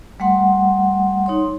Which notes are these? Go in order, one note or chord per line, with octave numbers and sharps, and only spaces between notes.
G3 A3 F#5 C6
D#4 C#5 C6